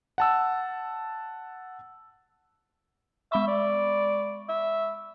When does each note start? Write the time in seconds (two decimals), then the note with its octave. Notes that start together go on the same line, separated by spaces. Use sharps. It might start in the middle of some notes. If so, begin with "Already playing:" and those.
0.18 F#5 A5 E6
3.32 G#3 E5 B5 C#6
3.48 D5
4.49 E5